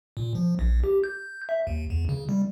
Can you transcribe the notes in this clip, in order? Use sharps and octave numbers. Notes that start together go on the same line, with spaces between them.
A#2
F3
A#1
G4
G6
E5
D#2
E2
C#3
G3